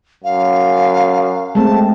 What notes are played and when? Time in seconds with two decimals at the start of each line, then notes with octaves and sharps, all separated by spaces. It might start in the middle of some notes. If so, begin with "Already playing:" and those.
0.24 F#2 F5
1.55 G#3 A3 C4 A5